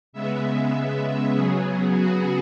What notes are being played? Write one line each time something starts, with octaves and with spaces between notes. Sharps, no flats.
C#3 G#3 B3 E5
C#3 F#3 B3 G#4
F#4